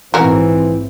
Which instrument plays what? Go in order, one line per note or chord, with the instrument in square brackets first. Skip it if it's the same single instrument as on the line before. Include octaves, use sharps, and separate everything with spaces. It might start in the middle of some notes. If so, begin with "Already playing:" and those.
[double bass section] A#1 G#2 C4 [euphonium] E3 [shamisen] F#4 A#4